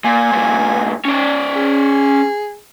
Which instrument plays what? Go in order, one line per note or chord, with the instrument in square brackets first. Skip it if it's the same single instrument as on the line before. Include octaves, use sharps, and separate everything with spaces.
[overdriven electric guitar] A#2 [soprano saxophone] G#5
[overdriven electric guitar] G2 A#2
C#4 D5
[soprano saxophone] G#4